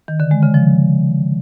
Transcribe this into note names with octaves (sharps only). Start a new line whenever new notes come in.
D#3
D3
G#3
C#3
F3